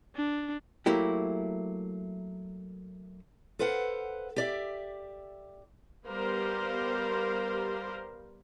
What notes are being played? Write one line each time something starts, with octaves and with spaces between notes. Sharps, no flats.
D4
F#3 A3 A#3 E4 G4
A4 B4 C5 F5 F#5
G4 D5 E5
G3 B3 G4 A#4 C5 F5